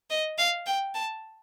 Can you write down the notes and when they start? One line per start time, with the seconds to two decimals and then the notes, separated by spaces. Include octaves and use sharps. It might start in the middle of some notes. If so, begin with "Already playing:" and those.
0.10 D#5
0.38 F5
0.67 G5
0.95 A5